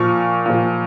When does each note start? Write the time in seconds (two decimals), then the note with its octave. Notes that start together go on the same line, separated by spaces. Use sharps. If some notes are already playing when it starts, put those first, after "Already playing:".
Already playing: A#2 F3 C#6 F6
0.46 A#2 F3